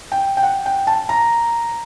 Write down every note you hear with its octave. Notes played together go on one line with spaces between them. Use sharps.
G5
G5
F#5
G5
A5
A#5